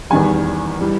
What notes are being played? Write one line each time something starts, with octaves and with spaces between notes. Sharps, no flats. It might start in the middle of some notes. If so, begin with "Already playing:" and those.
E2 D#3 G3 G#5
E3 G3